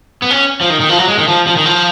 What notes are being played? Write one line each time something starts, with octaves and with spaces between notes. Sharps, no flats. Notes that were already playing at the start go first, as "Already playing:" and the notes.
B3
C#4
F3
D#3
D#3
F3
F#3
G#3
D#3
F3
F3
D#3
F3